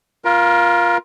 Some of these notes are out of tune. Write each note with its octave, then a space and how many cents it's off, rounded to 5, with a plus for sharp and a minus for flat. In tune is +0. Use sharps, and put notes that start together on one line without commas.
F4 +0 A#4 +30